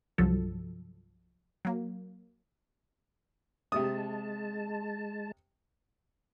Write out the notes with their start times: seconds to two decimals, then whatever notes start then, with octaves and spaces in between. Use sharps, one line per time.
0.18 C2 G2 F3 F#3 A4
1.65 F#3 A#3
3.72 C3 G#3 A5 D#6